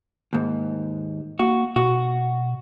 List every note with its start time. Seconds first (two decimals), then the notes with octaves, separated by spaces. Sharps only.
0.33 D#2 G#2
1.39 A#3 F#4
1.76 B2 F#4